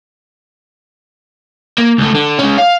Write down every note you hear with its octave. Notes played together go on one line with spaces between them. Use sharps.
A#3
C#2 A3
D3
G#3 C#4
F5